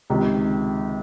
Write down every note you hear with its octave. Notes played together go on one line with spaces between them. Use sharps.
C#2 C3 D#3